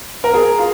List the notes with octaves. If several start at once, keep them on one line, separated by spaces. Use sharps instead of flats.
A#4
G#4
F4